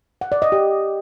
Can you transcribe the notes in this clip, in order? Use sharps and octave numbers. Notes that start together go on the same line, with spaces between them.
F#5
D5
D#5
G4